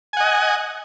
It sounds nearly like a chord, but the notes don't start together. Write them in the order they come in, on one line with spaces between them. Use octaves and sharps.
G#5 F#5 D#5